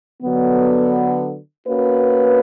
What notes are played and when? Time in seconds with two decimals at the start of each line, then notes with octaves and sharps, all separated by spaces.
0.22 D3 F#3 B3
1.66 A#3 C#4 F#4 B4